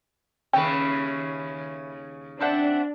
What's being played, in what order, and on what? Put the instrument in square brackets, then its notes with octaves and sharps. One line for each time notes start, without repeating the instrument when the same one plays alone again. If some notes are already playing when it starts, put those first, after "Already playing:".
[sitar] D#2 C#3 C#4 [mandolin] B4 E5 [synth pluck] G5
[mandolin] C4 E5 F#5 [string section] D4